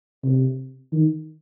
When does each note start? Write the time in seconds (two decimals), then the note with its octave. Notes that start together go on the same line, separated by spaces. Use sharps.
0.24 C3
0.92 D#3